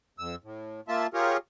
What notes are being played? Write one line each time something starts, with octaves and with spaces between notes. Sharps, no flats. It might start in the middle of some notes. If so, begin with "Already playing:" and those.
F2 E6
A2
A#3 F4 E5 A5
F4 G4 G#4 A#4 C#5